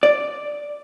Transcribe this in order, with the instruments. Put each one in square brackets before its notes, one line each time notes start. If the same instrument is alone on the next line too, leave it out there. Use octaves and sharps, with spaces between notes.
[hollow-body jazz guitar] D5